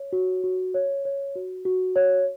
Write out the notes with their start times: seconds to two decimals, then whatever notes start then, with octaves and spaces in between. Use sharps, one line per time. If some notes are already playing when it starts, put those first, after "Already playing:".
Already playing: C#5
0.13 F#4
0.44 F#4
0.74 C#5
1.05 C#5
1.36 F#4
1.65 F#4
1.96 C#5